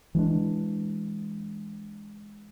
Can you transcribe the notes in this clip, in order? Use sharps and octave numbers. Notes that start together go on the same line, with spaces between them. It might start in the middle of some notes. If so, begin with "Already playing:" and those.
E3 G#3 C4 D4